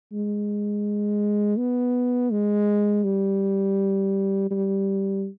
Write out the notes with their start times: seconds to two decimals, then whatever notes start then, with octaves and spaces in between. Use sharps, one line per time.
0.13 G#3
1.58 B3
2.32 G#3
3.04 G3
4.51 G3